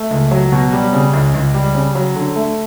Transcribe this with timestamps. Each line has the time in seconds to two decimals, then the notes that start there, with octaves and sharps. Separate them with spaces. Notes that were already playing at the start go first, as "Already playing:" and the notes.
Already playing: A3
0.11 C#2
0.31 F#3
0.52 B2
0.73 G3
0.93 C#3
1.14 C#2
1.34 C#2
1.54 G3
1.75 C#3
1.95 F#3
2.16 D3
2.36 A3